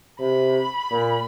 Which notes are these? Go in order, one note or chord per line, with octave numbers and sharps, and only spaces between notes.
C3 B5
A#2